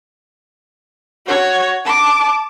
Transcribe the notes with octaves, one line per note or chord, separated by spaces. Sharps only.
F#4 C#5
A5 D6